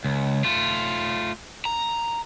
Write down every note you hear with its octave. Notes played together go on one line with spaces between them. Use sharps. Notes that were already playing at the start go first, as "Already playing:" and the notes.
C#2
A3 F4
A#5